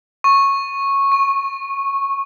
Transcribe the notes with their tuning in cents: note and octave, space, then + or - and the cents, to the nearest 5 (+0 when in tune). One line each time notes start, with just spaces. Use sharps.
C#6 -10
C#6 -30